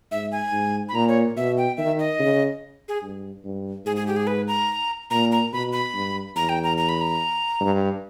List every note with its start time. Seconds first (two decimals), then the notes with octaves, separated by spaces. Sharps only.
0.11 G#2 E5
0.32 G#5
0.52 G#2
0.89 B5
0.94 A#2 A#5
1.08 C#5
1.37 B2 E5
1.58 G5
1.77 D#3 E5
1.99 D#5
2.19 C#3
2.88 G#4
3.02 G2
3.44 G2
3.86 G#2 G#4
3.96 G#4
4.07 G4
4.16 G#4
4.27 B4
4.47 A#5
5.10 A#2 A#5
5.32 A#5
5.53 B2 B5
5.72 B5
5.93 G2
6.35 E2 A#5
6.49 G5
6.64 A#5
6.77 A#5
6.89 B5
7.01 A#5
7.60 G2